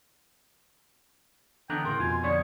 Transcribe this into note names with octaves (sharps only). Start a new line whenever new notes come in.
D3 E3 B3 D4 G5 A#5 F#6
A2 C#3 A#4 C6
F2 B2 F4 G#5
D3 F3 B3 C#5 D5